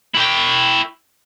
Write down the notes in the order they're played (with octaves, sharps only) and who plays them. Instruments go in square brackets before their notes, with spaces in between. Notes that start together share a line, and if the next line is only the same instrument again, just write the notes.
[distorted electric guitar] E4 G5